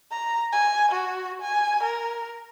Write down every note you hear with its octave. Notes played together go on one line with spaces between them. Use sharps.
A#5
G#5
F#4
G#5
A#4